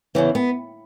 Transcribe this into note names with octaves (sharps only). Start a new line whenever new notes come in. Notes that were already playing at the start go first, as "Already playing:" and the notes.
E2 C#3 E3
B3